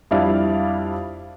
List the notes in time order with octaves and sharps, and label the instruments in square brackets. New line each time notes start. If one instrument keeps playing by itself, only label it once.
[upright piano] F2 G3 D4 E4 D5 F5